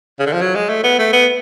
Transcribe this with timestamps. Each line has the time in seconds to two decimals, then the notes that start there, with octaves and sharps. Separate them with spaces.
0.20 C#3
0.27 D3
0.33 F3
0.41 F#3
0.55 G#3
0.69 A3
0.84 B3
0.99 A3
1.13 B3